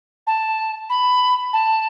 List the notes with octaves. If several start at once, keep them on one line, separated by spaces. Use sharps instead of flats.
A5
B5
A5